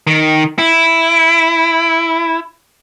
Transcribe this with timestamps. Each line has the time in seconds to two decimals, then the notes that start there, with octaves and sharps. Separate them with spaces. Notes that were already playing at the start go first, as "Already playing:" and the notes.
0.07 D#3
0.58 E4